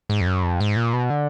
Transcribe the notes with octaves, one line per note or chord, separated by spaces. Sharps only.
G#2
F2
F#2
F2
G#2
A#2
B2
D3